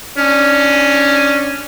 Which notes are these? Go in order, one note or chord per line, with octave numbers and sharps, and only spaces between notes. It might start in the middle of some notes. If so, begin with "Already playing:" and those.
C#4 D4